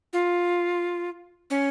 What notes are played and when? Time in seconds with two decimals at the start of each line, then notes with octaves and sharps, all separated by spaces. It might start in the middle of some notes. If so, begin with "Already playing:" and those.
0.13 F4
1.50 C#4